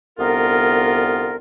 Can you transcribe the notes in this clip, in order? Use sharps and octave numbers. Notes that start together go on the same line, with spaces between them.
C2 D3 B3 F4 A#4